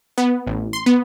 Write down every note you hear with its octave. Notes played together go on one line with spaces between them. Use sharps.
B3
A1
C6
B3